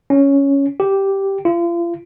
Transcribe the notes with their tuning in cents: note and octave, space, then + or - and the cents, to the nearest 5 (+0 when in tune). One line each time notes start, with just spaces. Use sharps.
C#4 +5
G4 -5
F4 -35